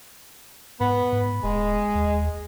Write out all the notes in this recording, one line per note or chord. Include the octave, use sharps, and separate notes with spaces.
G#2 B3
G#2
D#1 G#3
D#2